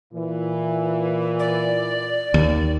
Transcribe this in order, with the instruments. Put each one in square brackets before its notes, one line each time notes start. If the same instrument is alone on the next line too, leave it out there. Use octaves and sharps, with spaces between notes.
[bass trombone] A#2 [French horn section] E3
[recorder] D5
[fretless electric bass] D#2